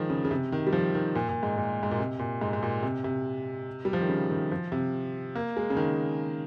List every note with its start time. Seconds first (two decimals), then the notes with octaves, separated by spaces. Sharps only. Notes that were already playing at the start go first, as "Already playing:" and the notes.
Already playing: D#3 F3 G#3
0.10 C#3
0.25 C#3
0.31 C3
0.52 D#3
0.67 G3
0.73 F3
0.95 D#3
1.15 A#2
1.29 A#2
1.43 G#2
1.58 A#2
1.83 G#2
1.91 A#2
1.99 C3
2.19 A#2
2.41 G#2
2.53 G#2
2.63 A#2
2.83 C3
3.04 C3
3.85 G3
3.93 F3
4.01 D#3
4.09 C#3
4.30 D#3
4.51 F3
4.72 C3
5.35 A#3
5.57 G#3
5.70 C#3
5.77 D#3